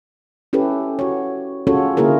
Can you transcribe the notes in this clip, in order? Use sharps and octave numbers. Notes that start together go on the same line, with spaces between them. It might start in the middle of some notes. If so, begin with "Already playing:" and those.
C#4 E4 G4 A4 B4
F#4 C#5
C#4 F4 F#4 G#4 A4 C#5
D3 A#3 E4 F4 G#4 A#4